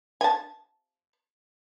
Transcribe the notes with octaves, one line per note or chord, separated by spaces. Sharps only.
G#5 A5